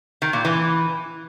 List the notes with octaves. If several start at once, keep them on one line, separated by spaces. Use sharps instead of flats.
D#3
A#2
E3